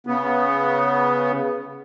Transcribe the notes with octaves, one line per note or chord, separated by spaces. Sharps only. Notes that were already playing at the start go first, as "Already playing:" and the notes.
C#3 B3